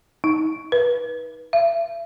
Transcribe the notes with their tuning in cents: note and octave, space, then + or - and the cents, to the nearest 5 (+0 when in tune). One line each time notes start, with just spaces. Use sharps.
D#4 +30
B4 -30
E5 +40